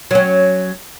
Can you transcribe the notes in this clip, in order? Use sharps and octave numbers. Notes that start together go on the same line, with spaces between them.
F#3 C#4